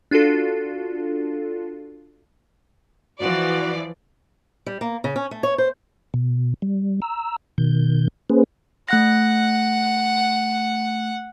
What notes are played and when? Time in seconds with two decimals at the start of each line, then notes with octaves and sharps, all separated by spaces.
0.11 D4 F4 F#4 A4
3.20 E3 F3 F#4 D5
4.66 G3
4.81 A#3
5.04 C#3
5.16 C#4
5.31 A3
5.43 C#5
5.58 C5
6.14 B2
6.62 G3
7.02 A#5 E6
7.58 B2 D#3 G6
8.30 A#3 C#4 G#4 B4 C5
8.89 A3 F#5 F#6 A#6